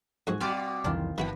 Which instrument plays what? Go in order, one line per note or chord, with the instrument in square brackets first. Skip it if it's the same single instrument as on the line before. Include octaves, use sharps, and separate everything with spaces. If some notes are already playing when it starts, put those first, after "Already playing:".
[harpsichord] F2 G#2 [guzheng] F#4 G#5
[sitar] B2 F#4 D5 [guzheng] G3 C4 F4 [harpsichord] G#5
[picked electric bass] C2 F2 E3 [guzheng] D#3 F4 [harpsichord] D4
[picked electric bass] G1 [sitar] D#2 [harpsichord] E3 F#4 G5 [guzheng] B4